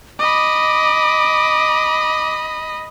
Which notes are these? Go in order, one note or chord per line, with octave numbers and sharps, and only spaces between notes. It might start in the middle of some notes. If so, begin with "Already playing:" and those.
D#5 B5 D6